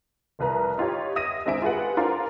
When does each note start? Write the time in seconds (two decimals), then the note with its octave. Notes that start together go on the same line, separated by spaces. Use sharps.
0.39 F1 C2 B4 A#5
0.77 D#4 F4 G4 C#5
1.16 E5 D#6 A#6 D#7
1.46 G#3 C4 D4 E5 G#5 D7
1.62 F4 G4 G#4 B4 F#5
1.97 D4 F4 A#4 C5 F5